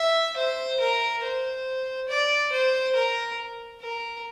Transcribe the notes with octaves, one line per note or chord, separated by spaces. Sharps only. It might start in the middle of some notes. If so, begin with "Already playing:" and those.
Already playing: E5
C5
A#4
C5
D5
C5
A#4
A#4